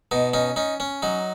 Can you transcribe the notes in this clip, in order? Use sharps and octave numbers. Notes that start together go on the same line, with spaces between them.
B2 D#4
C#4 D#4
C#4 D#4
C#4
F#3 D#4